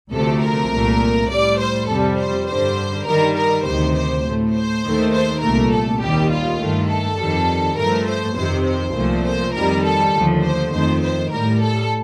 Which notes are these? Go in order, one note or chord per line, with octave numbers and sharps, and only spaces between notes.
D2 C3 F3 A3 A4
A#4
C2 A#2 A3
A2 G3 D5
C5
F2 C3 G3 A4
C5
G2 D3 G3 C5
G2 D#3 G3 A#4
A#4
D2 C3 D#3 C5
C5
A2 A3
C5
D#2 D#3 A3
C5
C2 A#2 A3 A#4
A4
D#2 D#3 G3 G4
F4
G2 D#3 A3
A4
F2 D#3 G3
G2 F3 A3 A#4
C5
F2 C3 D#3 C5
C5
C2 A#2 F3 A3
C5
F2 D#3 G3 A#4
A4
D#2 D3 F3 A3
C5
F2 D#3 A3 C5
C5
A2 G3 A#4
A4